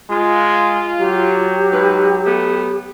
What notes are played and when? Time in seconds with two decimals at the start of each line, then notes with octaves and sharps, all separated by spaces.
0.10 G#3 F4
0.99 F#3 G4
1.73 G#2 B4
2.26 A3 B3